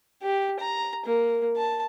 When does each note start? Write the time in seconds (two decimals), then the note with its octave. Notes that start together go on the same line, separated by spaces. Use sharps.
0.22 G4
0.59 A#5
1.05 A#3
1.56 A5